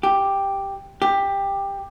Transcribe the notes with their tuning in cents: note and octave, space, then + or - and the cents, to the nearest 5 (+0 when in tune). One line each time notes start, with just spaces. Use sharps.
G4 +5
G4 +15